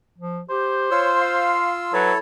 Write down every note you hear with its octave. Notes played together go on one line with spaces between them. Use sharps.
F3
G4 C5
F4 C#5 C6 E6
F5
F#3 E4 A4 B4 C#5